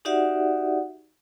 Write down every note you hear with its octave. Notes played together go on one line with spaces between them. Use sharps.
D#4 F#4 G4 D5 E5 F#5